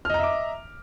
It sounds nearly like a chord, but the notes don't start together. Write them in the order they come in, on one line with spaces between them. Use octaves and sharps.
F6 D#5 A#5 E5 D6